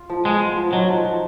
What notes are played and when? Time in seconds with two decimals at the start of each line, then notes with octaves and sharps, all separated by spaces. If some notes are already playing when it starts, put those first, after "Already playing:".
Already playing: F4
0.10 F3
0.25 G#3 B3
0.42 F4
0.57 F3
0.73 F#3 D#4
0.89 F3
1.04 F3